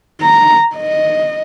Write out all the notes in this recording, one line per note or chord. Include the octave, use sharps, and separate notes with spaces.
A#5
D#5